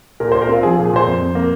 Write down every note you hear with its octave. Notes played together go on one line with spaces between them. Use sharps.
A#2 A#4
A#2 C5
A#4
C4 F4
F3 G#4
A#2 F4
G#4
A#2 C5
F2
F2
A#3